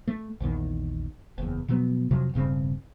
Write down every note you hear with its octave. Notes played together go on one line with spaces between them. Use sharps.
A3
A#1 E2 D#3
F#1 E2
B2 F3 F#3 B3
F2 C3 F3 F#3
E1 G2 C#3 C4